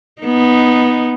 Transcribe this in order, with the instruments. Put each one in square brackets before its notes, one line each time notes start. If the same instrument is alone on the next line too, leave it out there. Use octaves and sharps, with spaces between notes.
[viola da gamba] B3 D#4